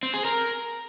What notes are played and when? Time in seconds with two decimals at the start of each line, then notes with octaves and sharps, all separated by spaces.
0.03 C4
0.14 G#4
0.25 A#4